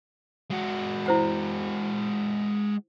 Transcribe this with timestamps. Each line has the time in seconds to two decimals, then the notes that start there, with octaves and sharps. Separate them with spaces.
0.51 G#3 F#4
1.06 E4 C5 F#5